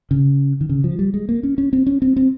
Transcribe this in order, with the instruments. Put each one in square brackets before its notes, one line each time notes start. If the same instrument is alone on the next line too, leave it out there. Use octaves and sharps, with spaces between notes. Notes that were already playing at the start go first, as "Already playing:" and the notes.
[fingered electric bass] C#3
D#3
C#3
F3
G3
G#3
A#3
C#4
C#4
C4
C#4
C4
C4